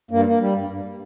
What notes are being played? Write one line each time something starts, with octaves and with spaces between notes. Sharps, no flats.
G2 A#3
A#3
G3
G2
G2